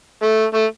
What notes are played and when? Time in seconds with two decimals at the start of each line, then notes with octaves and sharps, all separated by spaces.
0.22 A3
0.54 A3